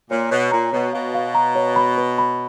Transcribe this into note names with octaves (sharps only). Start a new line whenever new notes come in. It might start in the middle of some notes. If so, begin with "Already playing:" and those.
A#2 C#5
B2 C#5
A#2 A#5
B2 C#5
B2 F5
F5
A#5
C#5
B5
B4
B5